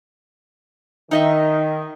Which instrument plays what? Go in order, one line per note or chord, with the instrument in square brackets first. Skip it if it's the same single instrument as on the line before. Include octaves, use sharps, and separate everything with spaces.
[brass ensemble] D#3 [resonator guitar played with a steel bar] D#4 D#5 E5